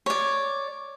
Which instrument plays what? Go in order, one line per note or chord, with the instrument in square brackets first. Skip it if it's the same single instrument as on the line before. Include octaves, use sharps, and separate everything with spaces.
[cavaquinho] C#5 D5